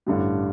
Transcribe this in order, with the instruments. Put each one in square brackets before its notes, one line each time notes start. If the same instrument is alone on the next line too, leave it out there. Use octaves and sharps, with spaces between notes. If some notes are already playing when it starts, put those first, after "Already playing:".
[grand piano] A1 G2 D3 G3